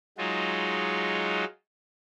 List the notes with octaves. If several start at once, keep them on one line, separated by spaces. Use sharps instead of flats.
F#3 G#3 D#4 F4 F#4